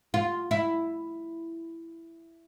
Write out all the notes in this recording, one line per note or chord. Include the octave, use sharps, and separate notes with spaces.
F4
E4